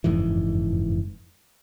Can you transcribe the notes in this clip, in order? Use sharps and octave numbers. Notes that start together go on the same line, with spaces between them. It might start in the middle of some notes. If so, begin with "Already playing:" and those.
F#1 F2 G#2 E3